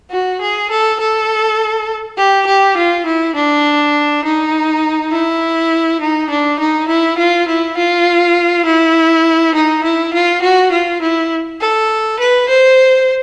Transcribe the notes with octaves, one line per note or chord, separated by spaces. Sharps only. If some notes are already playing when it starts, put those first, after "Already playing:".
F#4
G#4
A4
A4
G4
G4
F4
E4
D4
D#4
E4
D#4
D4
D#4
E4
F4
E4
F4
E4
D#4
E4
F4
F#4
F4
E4
A4
B4
C5